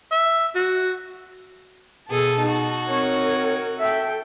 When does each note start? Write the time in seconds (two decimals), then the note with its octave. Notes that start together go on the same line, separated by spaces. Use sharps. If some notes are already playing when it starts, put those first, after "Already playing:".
0.11 E5
0.55 F#4
2.10 B2 G#4 A4 A5
2.42 D#4 F#4
2.88 C4 A#4 C#5
3.80 A4 E5 G5